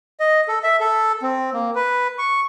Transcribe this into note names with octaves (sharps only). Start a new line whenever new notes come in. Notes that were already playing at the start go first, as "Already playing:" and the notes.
D#5
A4
E5
A4
C4
A#3
B4
C#6